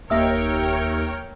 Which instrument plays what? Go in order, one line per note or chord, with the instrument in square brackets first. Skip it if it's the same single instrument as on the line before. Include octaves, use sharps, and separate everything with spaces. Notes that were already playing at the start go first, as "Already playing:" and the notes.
[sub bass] E1 [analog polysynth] D#2 [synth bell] A#3 E5 E6 [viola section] A#4 C#5 G5